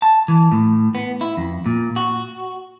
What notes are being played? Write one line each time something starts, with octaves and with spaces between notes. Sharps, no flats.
A5
E3
A2
B3
E4
F2
A#2
F#4